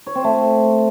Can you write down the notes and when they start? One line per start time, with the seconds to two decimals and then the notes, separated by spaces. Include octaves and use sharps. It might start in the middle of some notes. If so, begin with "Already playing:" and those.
0.06 C#5
0.15 C4
0.24 A3